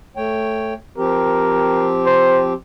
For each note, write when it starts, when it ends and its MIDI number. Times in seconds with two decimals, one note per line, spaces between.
0.17 0.74 57
0.17 0.74 73
0.17 0.74 79
0.97 2.53 53
0.97 2.53 60
0.97 2.53 67
0.97 1.95 70
2.06 2.44 72